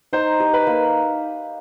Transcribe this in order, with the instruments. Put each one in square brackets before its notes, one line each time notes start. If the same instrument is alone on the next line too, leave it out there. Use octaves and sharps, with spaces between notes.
[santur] D#4 [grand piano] C5
[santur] G4
[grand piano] B4
[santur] A#3